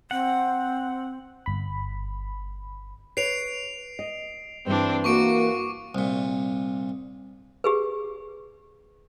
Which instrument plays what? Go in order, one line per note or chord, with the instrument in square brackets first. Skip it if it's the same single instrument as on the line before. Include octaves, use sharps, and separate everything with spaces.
[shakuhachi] C4 [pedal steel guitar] F#5
[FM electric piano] G1 B5
[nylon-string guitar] B4 C#5 [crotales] C7 D7 F7
[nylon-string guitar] D#5
[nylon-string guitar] G2 E3 [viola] C4 D4
[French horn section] A#3 [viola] F#4 [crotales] C#6 D6 D7
[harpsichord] C2 A#2
[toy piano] G4 G#4 B4